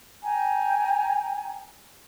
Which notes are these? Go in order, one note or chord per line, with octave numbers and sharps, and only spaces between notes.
G5 G#5 A#5